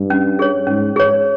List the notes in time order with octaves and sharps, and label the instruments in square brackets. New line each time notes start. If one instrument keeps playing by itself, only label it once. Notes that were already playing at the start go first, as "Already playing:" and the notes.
Already playing: [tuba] G2
[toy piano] C#4
G#4 C#5
[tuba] G#2 [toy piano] C#4
[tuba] G#2 [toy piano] G#4 C#5